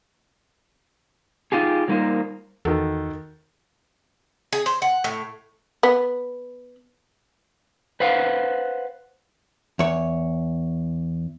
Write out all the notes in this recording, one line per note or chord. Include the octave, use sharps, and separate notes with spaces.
D#4 F4 G4 G#4
F#3 G3 A#3 D#4 A#4 C5
E2 D#3 F#4 A4
G#4
C5
F#5
A2
B3
B4 C5 F5 F#5
E2 C#5